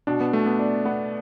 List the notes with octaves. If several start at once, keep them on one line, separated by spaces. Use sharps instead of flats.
B2 D4
B3
B2 A3
B3
D4
B3